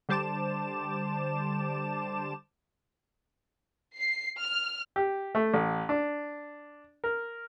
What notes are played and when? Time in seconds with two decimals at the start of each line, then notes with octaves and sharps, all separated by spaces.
0.09 D3 G3 C5 A5 D6 E7
3.96 C7
4.40 F6
4.96 G4
5.35 A3
5.54 A1
5.89 D4
7.04 A#4